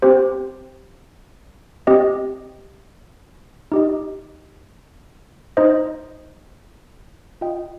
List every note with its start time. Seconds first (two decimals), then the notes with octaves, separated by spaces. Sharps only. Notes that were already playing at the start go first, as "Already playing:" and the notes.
0.02 C4 G4 C5
1.87 C4 G4 D#5
3.72 D#4 G4 D#5
5.57 D#4 C5 D#5
7.41 F4 D#5 G5